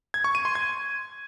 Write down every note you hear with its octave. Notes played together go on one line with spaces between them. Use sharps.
G#6
C#6
D#7
C6
G#6